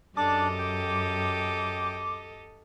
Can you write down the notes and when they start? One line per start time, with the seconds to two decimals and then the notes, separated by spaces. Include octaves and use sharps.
0.17 F#2 D4 G4 A4 D#5 A5 D6
0.58 G5